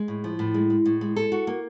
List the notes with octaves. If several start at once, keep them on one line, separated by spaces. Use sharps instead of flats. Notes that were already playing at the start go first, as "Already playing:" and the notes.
Already playing: G#3
A2
F3
A2
G#3
G#3
A2
G#3
A4
F#4
A#3